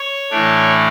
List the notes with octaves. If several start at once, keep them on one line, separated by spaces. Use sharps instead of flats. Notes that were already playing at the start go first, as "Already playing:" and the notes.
Already playing: C#5
A2 E3 A3 D4